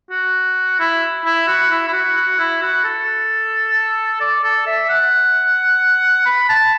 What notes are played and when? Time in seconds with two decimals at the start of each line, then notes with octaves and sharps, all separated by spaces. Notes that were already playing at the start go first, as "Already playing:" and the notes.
0.11 F#4
0.80 E4
1.25 E4
1.48 F#4
1.70 E4
1.88 E4
1.93 F#4
2.16 F#4
2.38 E4
2.62 F#4
2.84 A4
4.21 D5
4.43 A4
4.66 E5
4.89 F#5
6.25 B5
6.49 A5